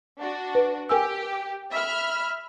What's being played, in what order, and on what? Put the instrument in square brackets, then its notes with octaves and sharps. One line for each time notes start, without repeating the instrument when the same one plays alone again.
[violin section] D4 F#4
[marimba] B4
[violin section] G4 [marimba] A#4 G#5 E6
[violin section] E5 B5 F6